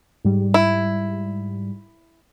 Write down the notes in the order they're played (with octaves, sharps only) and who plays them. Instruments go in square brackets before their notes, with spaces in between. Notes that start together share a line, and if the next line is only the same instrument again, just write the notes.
[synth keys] G#2 G3
[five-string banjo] E4